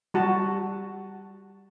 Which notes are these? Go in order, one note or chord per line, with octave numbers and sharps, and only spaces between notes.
G3 F#4 A5